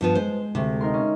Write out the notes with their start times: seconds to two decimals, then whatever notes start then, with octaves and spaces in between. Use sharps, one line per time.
0.01 G2 F3 B3
0.15 G#3 C5
0.55 D2 C3 A3
0.81 D#4 A#4 C6
0.94 C#4